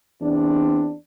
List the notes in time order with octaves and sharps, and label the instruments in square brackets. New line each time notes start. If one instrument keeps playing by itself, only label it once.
[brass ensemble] E2 C4 D4